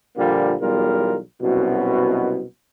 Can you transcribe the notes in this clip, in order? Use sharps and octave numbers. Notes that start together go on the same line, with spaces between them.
A#2 D3 F3 G3 A#3
B1 E2 G3 F4 A#4
C2 F#2 B2